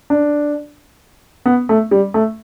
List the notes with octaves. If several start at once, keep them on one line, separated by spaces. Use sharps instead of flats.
D4
B3
A3
G3
A3